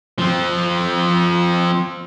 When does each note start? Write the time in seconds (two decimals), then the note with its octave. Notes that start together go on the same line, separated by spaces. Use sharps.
0.18 F3 C4